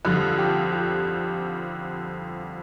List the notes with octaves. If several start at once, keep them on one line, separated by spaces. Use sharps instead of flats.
F2 D3 G3 F4
G4
G4